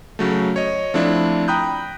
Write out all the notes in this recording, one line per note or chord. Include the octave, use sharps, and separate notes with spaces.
C#3 F#3 A3
C#5 D#5
F3 A3 C4 D4 E4
G5 A#5 B5 D#6 F#6 G6